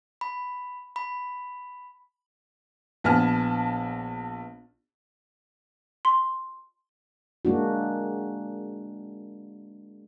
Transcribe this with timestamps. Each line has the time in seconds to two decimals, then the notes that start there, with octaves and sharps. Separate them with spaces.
0.21 B5
0.96 B5
3.04 A#1 B3 G#5 A5 F6
6.05 C6
7.45 G#3 A#3 D4 F#4